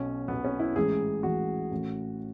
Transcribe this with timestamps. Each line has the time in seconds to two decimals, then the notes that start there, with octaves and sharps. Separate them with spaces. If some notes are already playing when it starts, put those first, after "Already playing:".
Already playing: B1 B2 C#4
0.28 B1 B3
0.33 B2
0.45 C#4
0.59 E4
0.76 A1 G#2 E3 G#4
1.23 A1 G#2 E3 F#4
1.71 A1 A2 E3